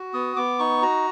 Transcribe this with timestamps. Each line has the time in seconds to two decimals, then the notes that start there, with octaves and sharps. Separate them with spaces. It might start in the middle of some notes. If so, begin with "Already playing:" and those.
Already playing: F#4
0.13 B3 D#6
0.36 B3 D6
0.59 D#4 C#6
0.82 F#4 A#5